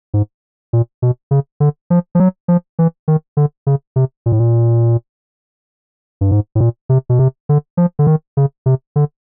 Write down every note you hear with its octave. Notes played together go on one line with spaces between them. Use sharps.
G#2
A#2
B2
C#3
D3
F3
F3
F#3
F3
E3
D#3
D3
C#3
C3
A#2
A2
A#2
G2
G#2
A2
A#2
C3
B2
C3
D3
F3
D3
D#3
C#3
C3
D3